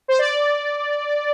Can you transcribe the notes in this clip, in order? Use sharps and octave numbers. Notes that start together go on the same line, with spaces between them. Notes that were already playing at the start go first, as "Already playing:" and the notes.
C5
D5